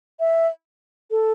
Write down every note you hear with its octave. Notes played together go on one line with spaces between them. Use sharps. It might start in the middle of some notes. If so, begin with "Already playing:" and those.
E5
A4